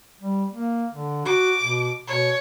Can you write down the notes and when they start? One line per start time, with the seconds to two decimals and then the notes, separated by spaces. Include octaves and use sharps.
0.21 G3
0.52 A#3
0.93 D3
1.26 F#4 D6
1.63 B2
2.07 B2 C#5